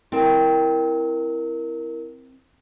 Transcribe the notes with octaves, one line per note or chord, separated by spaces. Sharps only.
C4 E4 A#4